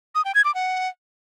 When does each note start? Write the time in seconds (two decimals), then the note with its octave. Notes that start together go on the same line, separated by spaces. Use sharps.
0.15 D#6
0.25 G5
0.35 G#6
0.45 D6
0.54 F#5